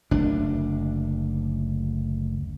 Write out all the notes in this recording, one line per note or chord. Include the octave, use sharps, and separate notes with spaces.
F#1 D2 D4